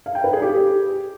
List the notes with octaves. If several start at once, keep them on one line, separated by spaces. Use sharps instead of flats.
F5
G5
B4
G#4
G4